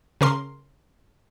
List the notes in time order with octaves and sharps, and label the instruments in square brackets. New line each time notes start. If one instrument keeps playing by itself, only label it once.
[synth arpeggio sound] C#3 A#4 C6